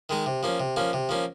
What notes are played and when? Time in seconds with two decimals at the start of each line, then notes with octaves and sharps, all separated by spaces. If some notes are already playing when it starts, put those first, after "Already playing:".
0.09 D#3 G#3 D#4
0.26 C3
0.43 F3 A#3 C#4
0.60 C3
0.76 F3 A#3 C#4
0.93 C3
1.09 F3 A#3 C#4